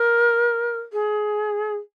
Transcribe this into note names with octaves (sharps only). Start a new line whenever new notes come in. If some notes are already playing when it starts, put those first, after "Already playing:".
Already playing: A#4
G#4